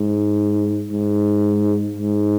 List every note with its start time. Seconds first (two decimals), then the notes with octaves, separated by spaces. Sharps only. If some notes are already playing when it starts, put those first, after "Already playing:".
Already playing: G#2
0.92 G#2
1.98 G#2